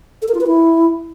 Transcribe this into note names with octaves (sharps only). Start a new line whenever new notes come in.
A4
A#4
F4
B4
E4